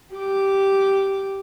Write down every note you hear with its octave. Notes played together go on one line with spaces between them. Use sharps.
G4 D6